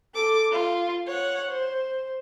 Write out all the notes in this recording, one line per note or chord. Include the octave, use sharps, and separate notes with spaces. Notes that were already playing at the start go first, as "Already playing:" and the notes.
A4 D6
F4
C#5 F#5
C5